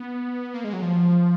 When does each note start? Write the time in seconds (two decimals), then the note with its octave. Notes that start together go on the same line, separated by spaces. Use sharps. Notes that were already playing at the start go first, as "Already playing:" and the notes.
Already playing: B3
0.54 A#3
0.64 G#3
0.73 F#3
0.82 F3